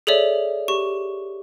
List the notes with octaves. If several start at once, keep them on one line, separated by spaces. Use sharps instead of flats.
G#4 A4 C#5 D5 E5
G4 C#6